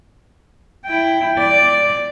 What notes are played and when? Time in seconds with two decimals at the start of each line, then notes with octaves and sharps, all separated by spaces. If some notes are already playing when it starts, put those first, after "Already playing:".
0.85 E4 G5
1.38 D5